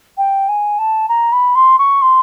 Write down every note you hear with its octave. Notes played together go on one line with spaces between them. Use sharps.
G5
G#5
A5
A#5
B5
C6
C#6
C6